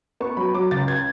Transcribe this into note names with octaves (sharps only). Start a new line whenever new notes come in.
B3 C#6
F#3 B5
F#3 D6
C#2 A6
G#6